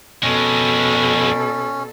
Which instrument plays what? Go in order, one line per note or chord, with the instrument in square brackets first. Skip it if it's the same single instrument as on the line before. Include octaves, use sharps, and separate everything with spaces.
[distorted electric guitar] F2 G#3 [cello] B2 A4 [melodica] C#4